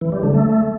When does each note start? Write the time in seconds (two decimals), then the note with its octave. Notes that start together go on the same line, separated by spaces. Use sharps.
0.01 E3
0.12 G3
0.23 D3
0.34 A3